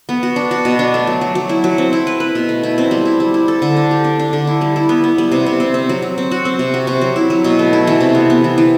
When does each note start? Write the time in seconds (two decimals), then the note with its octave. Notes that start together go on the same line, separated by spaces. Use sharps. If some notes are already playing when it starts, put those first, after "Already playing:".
0.09 B3
0.23 F#4
0.36 D4
0.51 F#4
0.65 B2
0.79 D4
0.94 A3
1.07 F#3
1.21 F#3
1.35 F#3
1.49 E4
1.64 F#3
1.78 C4
1.93 E4
2.07 B4
2.20 B4
2.35 B2
2.49 A3
2.63 E4
2.78 C4
2.91 G3
3.05 E4
3.20 G3
3.34 E4
3.48 A4
3.62 D3
3.77 D4
3.91 G4
4.04 D4
4.20 D4
4.33 D3
4.47 E4
4.61 G3
4.76 E4
4.89 B3
5.04 B3
5.18 G3
5.32 C3
5.46 C3
5.60 C4
5.74 C4
5.89 F#3
6.02 F#3
6.18 C4
6.31 F#4
6.45 C4
6.59 C3
6.74 F#4
6.87 C3
7.01 F#3
7.16 E4
7.30 F#3
7.44 B2
7.59 A3
7.73 E4
7.87 E3
8.00 C3
8.15 B3
8.30 B3
8.44 E3
8.58 E3